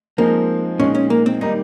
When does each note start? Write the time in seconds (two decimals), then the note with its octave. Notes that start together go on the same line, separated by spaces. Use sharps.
0.18 F3 G#3 A#3 C4 D#4
0.79 A#2 G#3 C#4 D#4
0.95 C#4
1.10 A#3
1.26 C4
1.41 D#3 G3 A#3 D#4